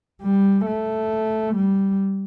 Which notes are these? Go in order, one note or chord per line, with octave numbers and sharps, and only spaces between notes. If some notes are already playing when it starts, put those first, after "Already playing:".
G3
A3
G3